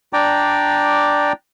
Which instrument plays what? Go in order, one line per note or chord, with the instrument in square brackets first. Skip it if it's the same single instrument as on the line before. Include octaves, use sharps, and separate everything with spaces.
[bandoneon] D4 D5 G5 A#5 D6